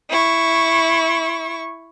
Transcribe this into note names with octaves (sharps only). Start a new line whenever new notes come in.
E4 C#6